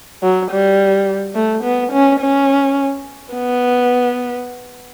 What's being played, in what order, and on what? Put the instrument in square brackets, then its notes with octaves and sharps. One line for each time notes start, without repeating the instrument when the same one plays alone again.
[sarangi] F#3
G3
A3
B3
C#4
C#4
B3